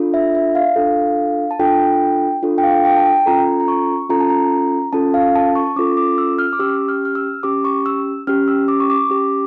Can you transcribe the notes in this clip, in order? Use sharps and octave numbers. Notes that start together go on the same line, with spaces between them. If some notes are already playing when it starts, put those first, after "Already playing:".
Already playing: D4 F4 A4
E5
E5
F5
D4 F4 A4
A5
D4 F4 A4 G5
D4 F4 A4
G5
F5
G5
A5
G5
C#4 F4 A4 A#5
A#5
C#6
C#4 F4 A4 A#5
A5
A#5
C#4 F4 A4 A5
F5
A5
C#6
C#4 F4 A4 D6
D6
E6
F6
D6
C#4 G4 E6
F6
F6
E6
C#4 G4 D6
C#6
E6
C#4 G4 F6
E6
D6
C#6
D6
C#4 G4